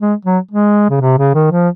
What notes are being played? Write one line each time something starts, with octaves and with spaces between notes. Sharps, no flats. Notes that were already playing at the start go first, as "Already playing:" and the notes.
G#3
F#3
G#3
C#3
C3
C#3
D#3
F3